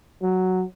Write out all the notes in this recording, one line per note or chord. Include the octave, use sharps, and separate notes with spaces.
F#3